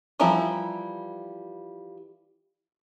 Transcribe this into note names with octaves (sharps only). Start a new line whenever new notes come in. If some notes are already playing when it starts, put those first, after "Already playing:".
E3 F3 G3 E4 A#5